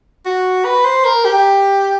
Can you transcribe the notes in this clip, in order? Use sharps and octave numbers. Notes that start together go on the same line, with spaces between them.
F#4
B4
C5
A#4
G4